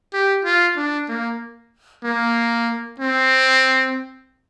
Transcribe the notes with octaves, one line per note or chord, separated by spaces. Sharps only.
G4
F4
D4
A#3
A#3
C4